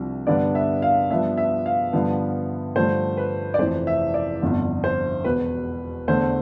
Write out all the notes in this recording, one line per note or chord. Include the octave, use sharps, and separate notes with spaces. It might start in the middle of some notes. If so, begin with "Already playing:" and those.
Already playing: C2 C3 F3 D4
G2 D3 G3 B3 D4 D5
E5
F5
G2 F3 B3 D4 E5
E5
F5
G2 D3 F3 B3
G2 D3 F3 A3 C5
B4
D5
F1 F2 E3 C5
E5
D5
G1 F2 D3
C5
E1 E2 B2 B4
E2 D3 A3 C5